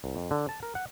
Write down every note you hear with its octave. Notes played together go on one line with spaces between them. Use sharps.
C2
F2
D3
A5
A#4
F#5